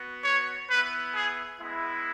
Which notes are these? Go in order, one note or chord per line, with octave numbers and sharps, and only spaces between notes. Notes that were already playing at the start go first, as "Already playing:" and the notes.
Already playing: B3 F#4
C#5
B3 E4 B4
G#4
G#3 B3 E4